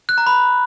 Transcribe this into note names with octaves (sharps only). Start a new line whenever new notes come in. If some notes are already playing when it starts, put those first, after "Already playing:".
F#6
A#5
B5